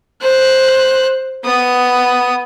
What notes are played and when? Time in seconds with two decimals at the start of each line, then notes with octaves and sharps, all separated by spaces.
0.22 C5 F#6
1.44 B3 D#6